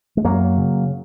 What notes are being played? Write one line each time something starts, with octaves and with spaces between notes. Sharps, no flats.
G#3
F#2 F#3 A#3
C#3